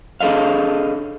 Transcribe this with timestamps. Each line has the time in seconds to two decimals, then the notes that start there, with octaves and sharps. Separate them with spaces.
0.21 D4 G#4 A4 D#5 F5